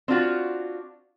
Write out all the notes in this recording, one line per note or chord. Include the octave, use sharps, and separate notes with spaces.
C4 D4 F4 F#4